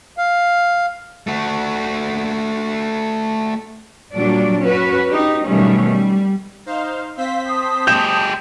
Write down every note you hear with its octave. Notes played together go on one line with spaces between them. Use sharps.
F5
A3 F#4
A#2 F#3 G3 D4 D5
C#4 F#4 B4
D#4 G4
B2 D#3 F#3 G3 A3 C#4
G3
D#4 C5 F5
C4 C5 F5 E6 B6
A5 D#6
G#3 G4 G6 E7